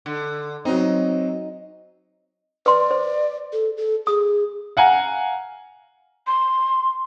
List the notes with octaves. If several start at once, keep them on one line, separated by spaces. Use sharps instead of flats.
D3
F#3 C4 D#4
B4 D5 C6
C5
A4
A4
G#4 D#6
F5 F#5 G#5 A#5
C6